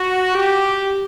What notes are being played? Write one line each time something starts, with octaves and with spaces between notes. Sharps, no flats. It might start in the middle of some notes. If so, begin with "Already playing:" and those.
Already playing: F#4
G4